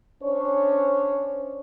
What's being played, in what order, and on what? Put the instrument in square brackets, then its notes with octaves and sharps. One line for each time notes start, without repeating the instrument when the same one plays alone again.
[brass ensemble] C#4 D4 C5 C#5